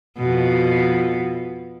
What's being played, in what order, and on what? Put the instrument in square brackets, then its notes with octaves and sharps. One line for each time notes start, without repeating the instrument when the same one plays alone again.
[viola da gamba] F2 B2